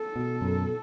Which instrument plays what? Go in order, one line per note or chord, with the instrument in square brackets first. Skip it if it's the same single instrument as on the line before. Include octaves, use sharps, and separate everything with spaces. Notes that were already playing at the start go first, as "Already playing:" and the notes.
Already playing: [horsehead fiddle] A4
[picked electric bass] B2
F#2